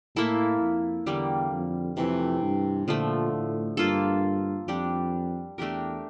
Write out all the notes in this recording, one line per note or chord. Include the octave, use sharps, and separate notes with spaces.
A2 A#3 E4 A4
F2
E2 D3 G3 A#3
F2
F2 C3 E3 A3
G2
A#2 D3 F3 A3
A2
G2 A#3 F4 A4
F2 G3 D4 G4
E2 A3 D4 G4 A#4